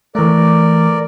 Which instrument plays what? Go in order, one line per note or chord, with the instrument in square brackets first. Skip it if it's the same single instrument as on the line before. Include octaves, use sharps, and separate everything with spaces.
[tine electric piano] E3 A3 [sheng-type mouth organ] A#4 D5